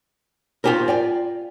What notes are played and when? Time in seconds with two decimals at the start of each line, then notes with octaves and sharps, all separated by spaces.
0.64 B3 F4 G4 A#4 C5 G#5
0.88 D5 G5 G#5